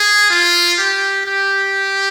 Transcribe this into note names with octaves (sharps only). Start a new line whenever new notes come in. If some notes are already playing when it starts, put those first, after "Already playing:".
Already playing: G#4
F4
G4
G4